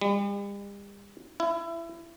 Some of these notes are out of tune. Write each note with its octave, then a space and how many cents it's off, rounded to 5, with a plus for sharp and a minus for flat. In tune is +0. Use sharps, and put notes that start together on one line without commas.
G3 +45
E4 +25